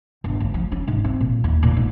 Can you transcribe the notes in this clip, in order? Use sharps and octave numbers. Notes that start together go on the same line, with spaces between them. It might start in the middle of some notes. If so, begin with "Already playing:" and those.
G1
D2
F3
C#4
G#2
C4
A#2
D#2
A#2
G#2